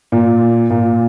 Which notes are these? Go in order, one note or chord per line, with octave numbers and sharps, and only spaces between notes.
A#2
A#2